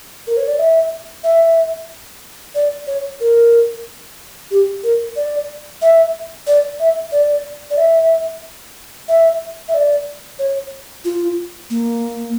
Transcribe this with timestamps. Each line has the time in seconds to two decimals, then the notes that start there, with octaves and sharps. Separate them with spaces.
0.27 A#4
0.37 C#5
0.47 D5
0.59 E5
1.24 E5
2.55 D5
2.87 C#5
3.20 A#4
4.51 G4
4.83 A#4
5.16 D5
5.81 E5
6.47 D5
6.79 E5
7.12 D5
7.70 D5
7.77 E5
9.08 E5
9.68 E5
9.74 D5
10.39 C#5
11.04 F4
11.70 A#3